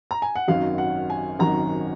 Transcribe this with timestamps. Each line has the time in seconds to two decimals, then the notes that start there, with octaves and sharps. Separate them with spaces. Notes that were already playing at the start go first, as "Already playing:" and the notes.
0.11 A#5
0.22 G#5
0.36 F#5
0.48 G#1 F#2 D#3 F#3 F5
0.78 F#5
1.10 G#5
1.39 G#1 F#2 D#3 F#3 A#5